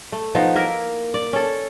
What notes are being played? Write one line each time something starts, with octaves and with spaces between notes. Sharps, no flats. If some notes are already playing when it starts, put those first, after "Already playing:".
A3
F3 B3 D#4 D#5
A#3 E4 A#4
D5
C#4 A4